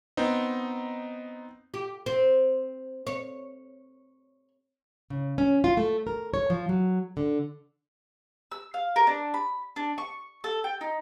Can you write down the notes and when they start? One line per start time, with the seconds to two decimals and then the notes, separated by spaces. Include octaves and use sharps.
0.17 B3 C4 D#4
1.74 G4
2.06 C4
3.07 C#5
5.10 C#3
5.38 C#4
5.64 F4
5.77 A3
6.07 A#4
6.34 C#5
6.50 F3
6.69 F#3
7.17 D3
8.52 E6
8.74 F5
8.96 A#4
9.07 D4
9.34 B5
9.76 D4
9.98 C#6
10.44 A4
10.64 G5
10.81 D#4